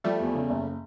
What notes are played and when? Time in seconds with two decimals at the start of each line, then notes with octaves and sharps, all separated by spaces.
0.04 F3 G3 A3
0.20 E2
0.35 C#3
0.50 F#1